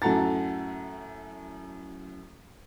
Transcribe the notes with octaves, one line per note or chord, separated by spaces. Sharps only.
F#2 A2 F#4 A4 A#5 A6